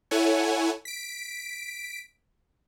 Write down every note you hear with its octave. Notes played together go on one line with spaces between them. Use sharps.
E4 A4 C#5 F#5 G#5
B6 D7